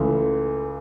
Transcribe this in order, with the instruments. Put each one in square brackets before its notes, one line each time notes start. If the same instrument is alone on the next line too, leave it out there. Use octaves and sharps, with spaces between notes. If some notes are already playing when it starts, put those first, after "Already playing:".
Already playing: [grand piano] C#2 C#3 E3 A3